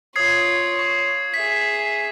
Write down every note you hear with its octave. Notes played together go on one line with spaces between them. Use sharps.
F4 C#5 D#6 G#6 C7
C#6
G#4 E5 B6